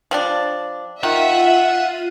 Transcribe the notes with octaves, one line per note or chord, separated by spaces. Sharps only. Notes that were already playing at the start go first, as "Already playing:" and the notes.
F3 G3 D4
D#3 F4 E5 F#5 D#7